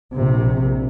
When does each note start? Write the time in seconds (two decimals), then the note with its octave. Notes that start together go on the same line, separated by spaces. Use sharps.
0.14 A#1 C3